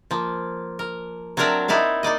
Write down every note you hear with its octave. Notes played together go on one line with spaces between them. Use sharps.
F3 A#3
A#4
F#3 C4 D4 A#4 D5 E5
D#4 E4 A#4 D5 F5
A#3 D#4 D5 D#5